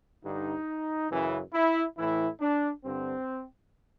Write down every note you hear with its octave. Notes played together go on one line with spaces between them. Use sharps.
G2 D3 D#4
F#2 C#3 E3
E4
A2 E3 E4
D4
G2 D3 C4